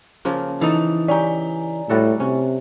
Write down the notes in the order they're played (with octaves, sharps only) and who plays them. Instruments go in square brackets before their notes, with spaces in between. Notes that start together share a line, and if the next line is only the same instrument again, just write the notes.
[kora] C#3 F3 A#3
[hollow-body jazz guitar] E3 D#4 [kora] A4
[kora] C#4 G4 [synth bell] D5 G#5 A#5
[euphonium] A2 [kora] G3 F#4 A4
[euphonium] C3 [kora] C#4